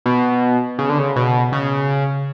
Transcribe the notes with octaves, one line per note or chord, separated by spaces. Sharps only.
B2
C#3
D3
C#3
B2
C#3